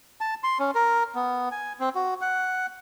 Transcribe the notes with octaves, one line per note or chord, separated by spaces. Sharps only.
A5
C6
C#4
A#4
B3
G#5
C4
F#4
F#5